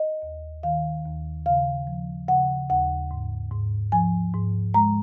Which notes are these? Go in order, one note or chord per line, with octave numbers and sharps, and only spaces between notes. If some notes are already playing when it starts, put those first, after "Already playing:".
Already playing: D#5
D#2
D#3 F5
D#2
C#3 F5
F3
C#3 F#5
D#2 F#5
G#2
G#2
F3 G#5
G#2
G#3 A#5